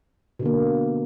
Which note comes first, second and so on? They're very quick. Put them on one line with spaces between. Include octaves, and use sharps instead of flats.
B2 D3 A#3